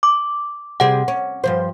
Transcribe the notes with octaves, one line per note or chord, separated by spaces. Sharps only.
D6
C3 G3 G#4 F#5
C#4
G2 F3 C5